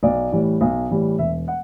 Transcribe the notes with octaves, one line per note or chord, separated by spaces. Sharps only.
B1 D5
A2 E3 G3
B1
A2 E3 G3
E1 E5
F#5